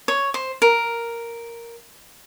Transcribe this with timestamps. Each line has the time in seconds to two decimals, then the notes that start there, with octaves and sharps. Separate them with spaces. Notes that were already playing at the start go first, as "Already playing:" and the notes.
0.08 C#5
0.34 C5
0.62 A#4